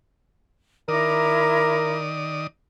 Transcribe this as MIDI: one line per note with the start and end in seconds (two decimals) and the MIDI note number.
0.88 2.47 51
0.88 1.99 64
0.88 2.09 70
0.88 2.47 74
0.88 1.99 82
0.88 1.99 86
0.88 2.47 87